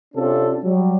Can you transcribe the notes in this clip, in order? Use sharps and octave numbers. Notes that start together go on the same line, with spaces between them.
C3 C#4 D4 F4 A4
F#3 G3